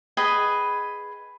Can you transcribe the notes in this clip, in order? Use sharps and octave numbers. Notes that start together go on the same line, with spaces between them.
G#4 B4 D#5 G5